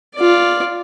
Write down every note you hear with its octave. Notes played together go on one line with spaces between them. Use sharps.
F4 D5